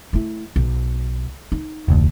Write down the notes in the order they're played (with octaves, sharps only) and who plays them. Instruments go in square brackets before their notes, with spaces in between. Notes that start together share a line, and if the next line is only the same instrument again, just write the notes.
[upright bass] A3 E4
B1
D#4
[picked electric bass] F1 D2